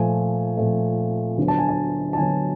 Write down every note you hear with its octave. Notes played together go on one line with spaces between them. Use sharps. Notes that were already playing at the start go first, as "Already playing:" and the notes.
Already playing: A#2 F3 A3 G#5
A#2 F3 A3
D2 D3 F#3 B3
A5
G#5
A5
A5
D2 D3 F#3 B3 G#5